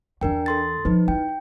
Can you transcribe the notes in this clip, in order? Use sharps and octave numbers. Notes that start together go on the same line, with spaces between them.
E2 E3 D4 A#4 G5
A4 C6 A6
F3 D#4 B4
E4 G5